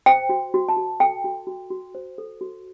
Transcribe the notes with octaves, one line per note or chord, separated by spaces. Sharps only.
C5 G5
F#4
F#4
A5
F#4
A4 G5
F#4
F#4
F#4
C5
A4
F#4